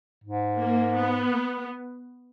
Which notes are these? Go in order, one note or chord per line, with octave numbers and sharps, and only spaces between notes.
G#2
A#3
B3